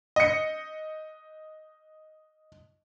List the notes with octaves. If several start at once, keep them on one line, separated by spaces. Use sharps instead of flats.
D#5 C#7